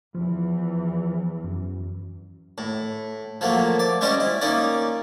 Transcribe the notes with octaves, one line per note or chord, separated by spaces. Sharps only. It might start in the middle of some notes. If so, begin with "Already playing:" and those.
E2 E3 F3
F#2
A2
F3 F#3 A3 A#3
D5
G3 G#3 C#4 C5 D5 D#5
E4
A#3 C#4 D#4 D5 A#5